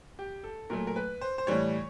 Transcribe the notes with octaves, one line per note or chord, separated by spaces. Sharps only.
G4
A4
A#2 F#3 A3 A#4
A#4
B4
C5
C5
A2 E3 G3 C#5